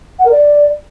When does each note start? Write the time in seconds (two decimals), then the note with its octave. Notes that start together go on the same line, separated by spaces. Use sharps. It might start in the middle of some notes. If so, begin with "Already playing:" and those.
0.19 F#5
0.25 A#4
0.31 D5